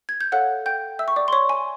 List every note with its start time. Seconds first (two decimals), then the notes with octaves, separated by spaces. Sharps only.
0.09 G#6
0.21 G6
0.32 A4 C#5 F5 F#5 F#6
0.66 G5 G6
0.99 E5 E6
1.08 C#6
1.16 D5 D6
1.28 C6
1.32 C#5 C#6
1.49 G#5